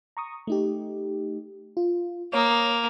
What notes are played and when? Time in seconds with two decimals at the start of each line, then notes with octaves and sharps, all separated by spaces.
0.17 A#5 C#6 D#6
0.47 A3 D#4 G4
1.77 F4
2.33 A#3 C#5 D#6